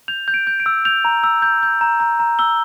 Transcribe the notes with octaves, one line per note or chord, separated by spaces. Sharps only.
G6 F7
G6
D7
G6
D7
E6
G6 F7
A#5
E6
G6
G6
A#5
A#5
A#5
E6 G7